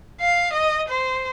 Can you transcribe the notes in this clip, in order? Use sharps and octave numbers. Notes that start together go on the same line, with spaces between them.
F5
D#5
C5